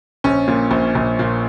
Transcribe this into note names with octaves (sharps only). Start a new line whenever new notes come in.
A#1 C#4
A#2
A#1
A#1
A#2